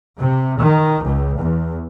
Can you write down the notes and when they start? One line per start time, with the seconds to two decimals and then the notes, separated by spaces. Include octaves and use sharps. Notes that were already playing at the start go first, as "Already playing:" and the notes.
0.20 C3
0.60 D#3
1.05 C#2
1.39 E2